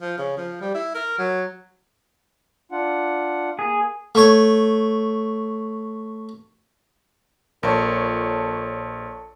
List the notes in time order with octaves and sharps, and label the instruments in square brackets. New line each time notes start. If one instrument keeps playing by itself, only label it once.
[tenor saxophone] F3
C#3
F3
G3
E4
A#4
F#3
[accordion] D4 F4 F#5
[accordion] A#3 [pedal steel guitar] G#4
[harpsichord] A3 C#5
[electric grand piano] A#1 [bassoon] A#2 [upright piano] A4 C#5 [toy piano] A#4 C6